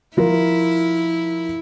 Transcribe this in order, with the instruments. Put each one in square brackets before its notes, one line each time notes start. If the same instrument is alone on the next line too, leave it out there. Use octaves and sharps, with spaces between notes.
[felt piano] F3 F4 A#4 [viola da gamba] E4